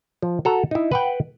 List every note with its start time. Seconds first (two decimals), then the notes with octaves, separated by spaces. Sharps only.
0.22 F3
0.45 F#4 A4 A#5
0.71 D#4 E4
0.92 B4 F#5 G5